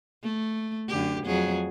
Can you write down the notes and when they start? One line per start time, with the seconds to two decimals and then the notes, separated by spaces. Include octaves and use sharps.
0.24 A3
0.89 F#2 D3 G4
1.25 F2 F#3 G#4